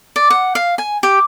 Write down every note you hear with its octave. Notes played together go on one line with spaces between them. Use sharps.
D5
F#5
F5
G#5
G4